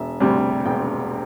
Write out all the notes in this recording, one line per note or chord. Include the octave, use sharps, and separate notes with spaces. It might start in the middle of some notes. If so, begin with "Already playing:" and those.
Already playing: E1 E5
D2 C3 G3
E1 G5